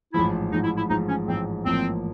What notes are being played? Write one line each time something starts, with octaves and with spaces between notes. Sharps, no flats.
A1 G#2 F3 E4
A1 G#2 F3 D#4
E4
E4
A1 G#2 F3 D#4
C#4
A1 G#2 F3 C4
A1 G#2 F3 A#3 C4